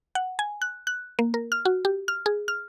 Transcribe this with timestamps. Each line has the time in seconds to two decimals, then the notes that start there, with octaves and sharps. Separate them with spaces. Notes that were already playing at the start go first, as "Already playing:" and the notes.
0.15 F#5
0.39 G#5
0.62 F#6
0.87 F#6
1.19 A#3
1.34 A#4
1.52 F6
1.65 F#4
1.85 G4
2.08 F6
2.26 G#4
2.48 F6